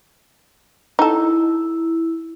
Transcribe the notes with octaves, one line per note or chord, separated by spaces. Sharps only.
D#4 E4 A4